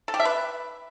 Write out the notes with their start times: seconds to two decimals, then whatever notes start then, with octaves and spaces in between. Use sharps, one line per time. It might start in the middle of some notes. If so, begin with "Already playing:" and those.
0.08 A4
0.14 G4
0.20 E5
0.25 B4